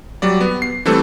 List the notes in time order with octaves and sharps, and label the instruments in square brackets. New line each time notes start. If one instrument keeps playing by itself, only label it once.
[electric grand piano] F#3 G3 D5
B3
C7
E3 G3 A3 C4 A4